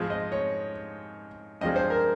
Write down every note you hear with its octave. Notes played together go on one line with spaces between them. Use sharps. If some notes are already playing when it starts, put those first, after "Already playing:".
Already playing: G#2 F3 G#3
D#5
C#5
G2 F3 G#3 D#5
C5
A#4